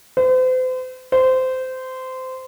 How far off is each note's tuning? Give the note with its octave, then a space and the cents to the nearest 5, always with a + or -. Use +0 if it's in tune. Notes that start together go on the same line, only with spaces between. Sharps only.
C5 -40
C5 -20